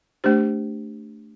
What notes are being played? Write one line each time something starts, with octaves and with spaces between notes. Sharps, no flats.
A3 D4 G4 C5